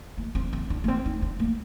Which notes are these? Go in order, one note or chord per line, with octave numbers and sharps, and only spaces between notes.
A#3
C4
C4
D4
A#3
C4
D#4
D4
A#3